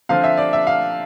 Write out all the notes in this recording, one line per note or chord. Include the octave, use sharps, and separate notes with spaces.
D3 F3 C4 F5
E5
D5
E5
F5